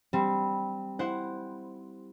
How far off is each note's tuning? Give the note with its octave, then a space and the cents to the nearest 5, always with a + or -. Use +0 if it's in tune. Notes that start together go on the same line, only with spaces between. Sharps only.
G3 +0 C4 -10
E4 +0 C5 +0 F#5 +0